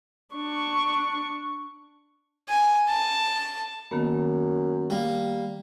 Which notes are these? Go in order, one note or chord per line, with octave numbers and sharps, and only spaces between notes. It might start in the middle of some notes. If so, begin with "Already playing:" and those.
D4 C#6
G#5
A5
F#2 D#3 A#3 B3
G3 A#3 G5